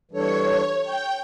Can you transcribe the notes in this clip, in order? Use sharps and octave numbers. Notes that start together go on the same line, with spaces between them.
E3 G3 D4 A4 C#5
G5